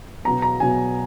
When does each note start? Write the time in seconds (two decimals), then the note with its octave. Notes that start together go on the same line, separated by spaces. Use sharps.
0.25 B2 F#3 B3 A#5
0.42 A#5
0.60 B2 F#3 B3 G#5